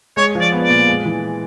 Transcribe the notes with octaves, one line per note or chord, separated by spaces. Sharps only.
G#3 C#5
F3
D5
B3
D5
A#2
G#3
E3